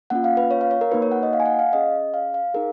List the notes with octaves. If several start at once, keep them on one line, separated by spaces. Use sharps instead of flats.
A#3 C#4 F4 F#5
F5
B4
C#5
F5
C#5
A#4
A#3 D#4 F#4 B4
C#5
F#5
D#5
F5
G#5
F#5
F5
C#4 G#4 D#5
F5
F5
D#4 G#4 A#4